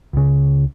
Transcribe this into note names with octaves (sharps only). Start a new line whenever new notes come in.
C#2 C#3